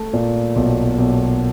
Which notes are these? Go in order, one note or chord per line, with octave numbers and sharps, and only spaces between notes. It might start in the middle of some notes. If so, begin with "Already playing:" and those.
Already playing: A3
A#2
B1
B1